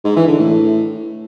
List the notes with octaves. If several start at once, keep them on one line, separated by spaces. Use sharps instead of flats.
G#2
E3
D3
A2